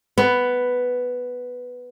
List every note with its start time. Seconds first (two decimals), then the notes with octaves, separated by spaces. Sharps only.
0.18 B3